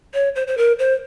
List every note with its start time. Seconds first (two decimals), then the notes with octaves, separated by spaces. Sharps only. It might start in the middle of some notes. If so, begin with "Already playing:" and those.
0.14 C#5
0.36 C5
0.47 C5
0.57 A#4
0.79 C5